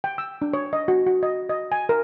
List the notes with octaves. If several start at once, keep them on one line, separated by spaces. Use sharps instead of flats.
G5
E6
D4
C#5
D#5
F#4
F#4
D#5
D#5
G#5
A#4